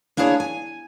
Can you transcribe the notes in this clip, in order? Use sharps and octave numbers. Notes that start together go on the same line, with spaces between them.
A#3 D4 E4 G#4 C#5
G#5